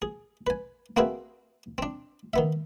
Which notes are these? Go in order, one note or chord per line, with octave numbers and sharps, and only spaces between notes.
G#4
B4 G#5
A#3 C4 F#4 G#4 B4 E5
C4 D4
D#3 B3 E5